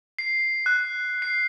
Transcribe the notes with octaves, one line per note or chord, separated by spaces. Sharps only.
C7
F#6
C7